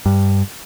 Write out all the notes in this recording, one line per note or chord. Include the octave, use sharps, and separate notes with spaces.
G2